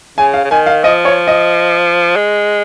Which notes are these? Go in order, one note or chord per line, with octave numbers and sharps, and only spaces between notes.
C#3 G#5
F5
C#3
D#3 G#5
F5
F3 D#5
C#5
D#5
G#3